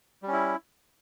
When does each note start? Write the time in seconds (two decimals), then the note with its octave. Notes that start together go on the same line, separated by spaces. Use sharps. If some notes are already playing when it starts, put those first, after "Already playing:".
0.23 G3
0.28 C#4
0.33 E4